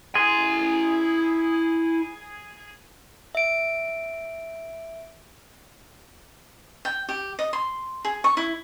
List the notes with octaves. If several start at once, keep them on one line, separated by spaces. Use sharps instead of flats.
E4 G#4 C6
E5 D7
G5
G4
D#5
C6
G#4
C#6
E4